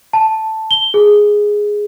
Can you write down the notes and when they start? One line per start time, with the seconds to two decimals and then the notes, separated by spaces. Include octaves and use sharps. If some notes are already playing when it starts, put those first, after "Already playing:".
0.13 A5
0.71 G7
0.94 G#4